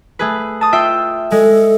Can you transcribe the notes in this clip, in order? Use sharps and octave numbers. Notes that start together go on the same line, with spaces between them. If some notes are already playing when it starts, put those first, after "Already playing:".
A3 G#4 B4
A5 D#6
F4 E5 G5
G#3 A4